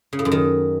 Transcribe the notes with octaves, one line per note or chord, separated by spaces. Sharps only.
C#3
A2
F#2
D#3